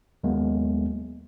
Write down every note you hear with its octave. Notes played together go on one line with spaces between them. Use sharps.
D#2 F#3 G#3 A#3 B3